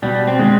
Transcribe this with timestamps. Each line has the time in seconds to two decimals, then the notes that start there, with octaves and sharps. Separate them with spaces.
0.02 B2 G3
0.27 C4
0.39 G#3 C4